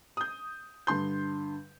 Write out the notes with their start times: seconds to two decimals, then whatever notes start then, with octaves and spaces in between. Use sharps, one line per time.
0.17 D#6 G6
0.87 G2 D3 C6 G6